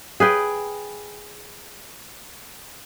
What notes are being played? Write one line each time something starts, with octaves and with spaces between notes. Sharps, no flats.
G#4 B4 G5